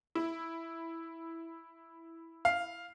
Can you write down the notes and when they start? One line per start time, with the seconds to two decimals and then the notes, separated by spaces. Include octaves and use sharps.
0.15 E4
2.45 F5